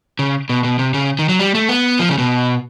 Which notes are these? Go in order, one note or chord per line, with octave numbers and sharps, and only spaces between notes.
C#3
B2
B2
C3
C#3
D#3
F#3
G3
A3
B3
F3
C#3
B2